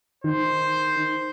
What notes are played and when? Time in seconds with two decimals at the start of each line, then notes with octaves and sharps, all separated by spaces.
0.24 D#3 C5